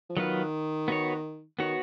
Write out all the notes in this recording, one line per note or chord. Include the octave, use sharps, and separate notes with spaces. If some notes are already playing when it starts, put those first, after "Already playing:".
F3
D#3 F#3 B3 F4 B4
B3 F#4 C#5
D#3 B3 F#4 C#5